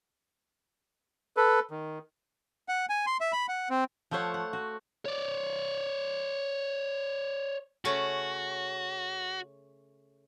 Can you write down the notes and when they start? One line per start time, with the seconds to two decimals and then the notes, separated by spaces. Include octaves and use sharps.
1.37 A4 B4
1.71 D#3
2.69 F#5
2.89 G#5
3.07 C6
3.21 E5
3.32 B5
3.48 F#5
3.70 C4
4.11 F3 A3 C5 C#5 F#5
4.34 F#5
4.53 F#4
5.05 C#5 D5
7.85 C#3 A3 C#4 F#4